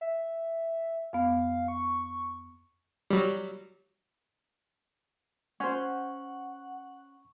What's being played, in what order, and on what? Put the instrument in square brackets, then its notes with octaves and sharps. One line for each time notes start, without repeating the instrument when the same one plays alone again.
[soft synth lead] E5
[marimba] F2 B3 [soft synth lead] F5
[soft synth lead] C#6
[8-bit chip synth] F#3 G3
[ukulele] C#4 C5 [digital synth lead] F#5 [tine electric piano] C#6